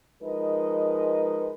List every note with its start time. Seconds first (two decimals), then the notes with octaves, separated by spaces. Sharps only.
0.22 F3 G#3 D#4 A#4 B4 D#5